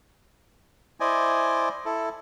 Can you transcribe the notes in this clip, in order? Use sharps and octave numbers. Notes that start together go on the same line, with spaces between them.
E4 C5 D5 D#5 G#5
E4 A4